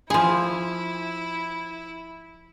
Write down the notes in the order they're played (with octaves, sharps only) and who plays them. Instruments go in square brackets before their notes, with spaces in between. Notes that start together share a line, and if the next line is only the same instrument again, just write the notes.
[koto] F3 G#4 [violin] E4